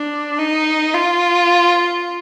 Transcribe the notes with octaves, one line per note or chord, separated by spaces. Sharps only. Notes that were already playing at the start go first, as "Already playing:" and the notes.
Already playing: D4
D#4
F4